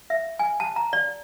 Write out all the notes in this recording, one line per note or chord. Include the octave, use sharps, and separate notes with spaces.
E5
G#5
A5
A#5
D5